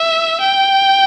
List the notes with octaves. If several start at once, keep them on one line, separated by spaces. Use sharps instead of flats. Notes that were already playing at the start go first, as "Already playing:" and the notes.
Already playing: E5
G5